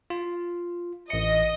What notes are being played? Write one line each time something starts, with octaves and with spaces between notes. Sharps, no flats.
F4
A1 D#5 C#7